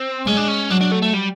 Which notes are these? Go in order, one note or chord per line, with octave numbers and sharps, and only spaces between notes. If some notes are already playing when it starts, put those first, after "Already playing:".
Already playing: C4
G#3 C#4
D4
C#4
F#3 D4
D4
A3
A3
G3